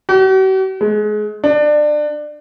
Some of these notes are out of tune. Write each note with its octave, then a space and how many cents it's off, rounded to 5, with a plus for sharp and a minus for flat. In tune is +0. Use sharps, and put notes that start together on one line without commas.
F#4 +45
G#3 +25
D4 +25